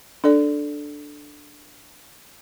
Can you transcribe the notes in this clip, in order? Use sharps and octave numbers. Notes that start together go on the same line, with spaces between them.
D4 A4 D5